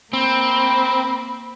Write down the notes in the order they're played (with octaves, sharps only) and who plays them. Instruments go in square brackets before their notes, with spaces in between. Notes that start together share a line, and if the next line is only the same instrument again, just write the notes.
[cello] A#3 [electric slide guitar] C4 [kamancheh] B5